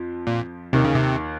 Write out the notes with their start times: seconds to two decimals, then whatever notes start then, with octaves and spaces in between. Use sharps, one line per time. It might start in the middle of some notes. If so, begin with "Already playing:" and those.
Already playing: F2 F3
0.27 A#2
0.73 D#2 C3 D#3
0.85 C#3
0.95 C3